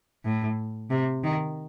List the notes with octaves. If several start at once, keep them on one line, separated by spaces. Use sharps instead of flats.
A2
C3
D#3